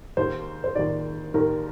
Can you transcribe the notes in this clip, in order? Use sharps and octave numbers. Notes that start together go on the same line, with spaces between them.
D#2 D#3 C5
C5
D#2 D#3 D5
D#2 D#3 A#4